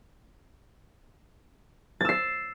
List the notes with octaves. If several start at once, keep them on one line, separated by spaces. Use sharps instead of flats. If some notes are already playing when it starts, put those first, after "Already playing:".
E6 A6 C7